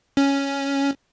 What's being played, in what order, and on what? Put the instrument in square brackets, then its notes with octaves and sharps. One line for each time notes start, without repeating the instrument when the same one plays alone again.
[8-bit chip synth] C#4